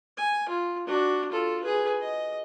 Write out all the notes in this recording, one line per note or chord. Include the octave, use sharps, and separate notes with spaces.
G#5
F4
D4 F#4
F4 A4
G#4 B4
D#5